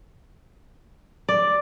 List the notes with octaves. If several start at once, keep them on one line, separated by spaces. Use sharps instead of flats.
D5